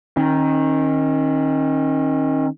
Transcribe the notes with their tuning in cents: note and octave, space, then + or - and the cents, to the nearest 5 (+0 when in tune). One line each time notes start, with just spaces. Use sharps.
D#3 +0 C#4 -45